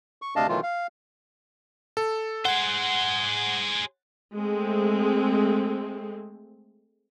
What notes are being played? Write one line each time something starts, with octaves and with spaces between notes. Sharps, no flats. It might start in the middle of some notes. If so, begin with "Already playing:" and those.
C#6
D2 C3 D4 D#5 F5 A5
B2 D#3 E3 F#3 A3 F4
F5
A4
G#4 C5 F#5
G#3 A3 C4